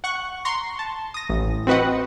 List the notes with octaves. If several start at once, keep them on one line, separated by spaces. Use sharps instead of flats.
F#5 C#6 F#6
A#5 C6 C#6
A5
D#6 A#6
A1
C4 F#4 B4 D#5 F#5